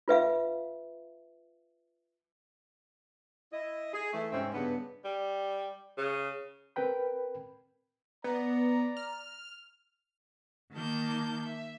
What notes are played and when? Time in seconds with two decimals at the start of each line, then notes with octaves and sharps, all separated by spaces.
0.08 F4 B4 E5 F5
3.52 E4 D#5
3.92 G#4
4.13 E3 A3
4.32 G#2 C3 C4 C#4 E5
4.54 G2 C#3 B3
5.04 G3
5.98 C#3
6.76 C4 A#4 B4 G5 B5
8.24 B3 D5 A#5
8.97 F6
10.74 D#3 A#3 A5 G6
11.44 E5